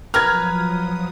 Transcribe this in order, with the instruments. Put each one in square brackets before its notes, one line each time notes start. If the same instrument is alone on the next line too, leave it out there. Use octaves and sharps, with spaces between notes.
[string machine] F3 F#3 D#6 [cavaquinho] A#4 B4 [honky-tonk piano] F6 G#6